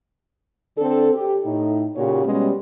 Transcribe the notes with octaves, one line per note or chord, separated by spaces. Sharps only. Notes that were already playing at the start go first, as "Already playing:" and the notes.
D3 C4 D4 A4
G4
A2 D#4
A#2 C#3 F#4 G4 C#5
B2 G3 G#3 C#4